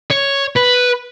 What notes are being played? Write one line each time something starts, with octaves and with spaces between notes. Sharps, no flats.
C#5
B4